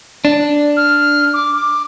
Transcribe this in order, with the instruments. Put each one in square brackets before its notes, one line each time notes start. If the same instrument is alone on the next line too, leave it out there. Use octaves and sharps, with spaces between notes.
[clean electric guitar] D4
[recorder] F6
D6
D6